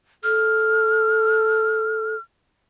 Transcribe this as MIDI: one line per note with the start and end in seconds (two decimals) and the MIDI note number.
0.24 2.15 69
0.24 2.20 89